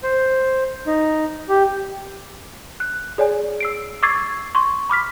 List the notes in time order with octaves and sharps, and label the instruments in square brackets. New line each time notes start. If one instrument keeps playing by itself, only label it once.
[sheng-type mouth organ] C5
D#4
G4
[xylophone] F#6
G#4 C#5 D5 G#5
E6 C7 D7
C#6 D6 E6 G#6 A6 C7
C6 C#6
B5 D6 F6 B6